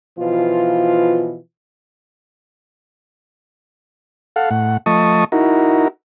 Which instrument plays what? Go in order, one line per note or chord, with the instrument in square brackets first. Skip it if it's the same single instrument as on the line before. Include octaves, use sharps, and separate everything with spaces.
[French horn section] B2 E3 F3 F4
[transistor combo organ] A4 F5 F#5
A2 F#5
F3 A3 D#5 A5 C#6 D#6
D#4 E4 F#4 A#4